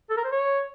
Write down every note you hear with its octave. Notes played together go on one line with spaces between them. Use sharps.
A4
A#4
C5
C#5